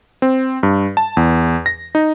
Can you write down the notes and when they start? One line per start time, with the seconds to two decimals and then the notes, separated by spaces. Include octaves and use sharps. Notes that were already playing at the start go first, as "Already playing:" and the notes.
0.22 C4
0.63 G2
0.97 A5
1.17 E2
1.66 A#6
1.95 D#4